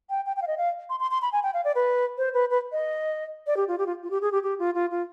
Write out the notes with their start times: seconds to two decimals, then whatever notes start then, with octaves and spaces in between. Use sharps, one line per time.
0.10 G5
0.26 G5
0.36 G5
0.42 F5
0.47 D#5
0.58 F5
0.90 C6
1.00 C6
1.11 C6
1.22 B5
1.33 G#5
1.43 G5
1.54 F5
1.65 D5
1.75 B4
2.18 C5
2.34 B4
2.51 B4
2.72 D#5
3.47 D5
3.57 G4
3.68 F4
3.79 G4
3.86 F4
4.03 F4
4.11 G4
4.22 G#4
4.32 G4
4.43 G4
4.59 F4
4.75 F4
4.91 F4